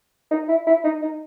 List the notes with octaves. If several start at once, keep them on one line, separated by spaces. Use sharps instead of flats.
D#4
E4
E4
D#4
D#4